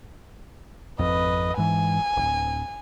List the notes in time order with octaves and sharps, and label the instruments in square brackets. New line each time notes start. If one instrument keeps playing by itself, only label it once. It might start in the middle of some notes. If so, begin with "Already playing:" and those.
[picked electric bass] G#1 F2 [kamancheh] B4 D#5
[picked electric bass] G#2 E3 [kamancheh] G#5
[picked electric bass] D1 G#1